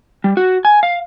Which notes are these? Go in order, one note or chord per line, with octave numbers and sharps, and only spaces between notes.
G3
F#4
G#5
F5